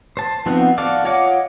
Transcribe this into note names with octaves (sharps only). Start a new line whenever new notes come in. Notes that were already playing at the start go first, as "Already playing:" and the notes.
C5 A5
F3 B3 C4 D#4 F#4
F#4 A4 D5 F5 D6
F4 C#5 D#5 F#5 D6